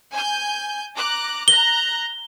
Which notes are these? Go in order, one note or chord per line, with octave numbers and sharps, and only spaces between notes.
G#5 G6
A#5 D6 F#6
A#5 F#6 A#6 G7